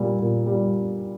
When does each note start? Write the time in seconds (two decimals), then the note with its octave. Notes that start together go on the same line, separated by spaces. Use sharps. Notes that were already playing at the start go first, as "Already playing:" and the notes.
Already playing: A#2 G3
0.20 A#2
0.46 G3